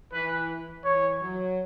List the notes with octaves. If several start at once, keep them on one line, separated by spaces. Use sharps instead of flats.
E3 B4
E3 C#5
F#3